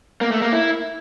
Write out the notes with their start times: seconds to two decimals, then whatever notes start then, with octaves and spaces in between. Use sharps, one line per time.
0.21 A#3
0.32 A3
0.42 A#3
0.52 E4